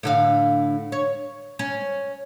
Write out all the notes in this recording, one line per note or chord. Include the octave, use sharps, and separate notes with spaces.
A2 D3 F5
C#5
C#4